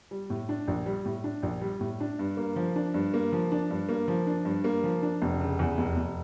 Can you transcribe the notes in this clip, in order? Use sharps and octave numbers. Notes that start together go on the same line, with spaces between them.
G3
A2
D4
A#1
G3
A2
D4
A#1
G3
A2
D4
G2
A#3
F3
D4
G2
A#3
F3
D4
G2
A#3
F3
D4
G2
A#3
F3
D4
F1
C#3
E2
F1
F1